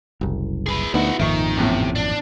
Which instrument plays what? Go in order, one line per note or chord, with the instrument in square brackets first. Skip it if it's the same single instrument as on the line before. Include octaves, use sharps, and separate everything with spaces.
[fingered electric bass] F#1 C2
[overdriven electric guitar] G#4 B4
[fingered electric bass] D2 [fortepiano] B3 D#4 [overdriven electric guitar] E4 F#4
[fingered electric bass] G#1 F2 A#2 [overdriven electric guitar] D#3 [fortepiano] E5 C#6
[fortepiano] E2 A2 C#4 [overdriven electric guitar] C3
[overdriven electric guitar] D4